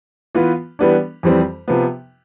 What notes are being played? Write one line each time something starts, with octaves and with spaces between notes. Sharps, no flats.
E3 B3 F4
E3 G3 B3 D4
F2 E3 G3 C4
C3 F3 B3